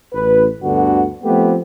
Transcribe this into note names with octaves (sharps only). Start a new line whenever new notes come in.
A1 B4
D2 G2 D3 B3 F#4
F3 A3 B3 C4 G4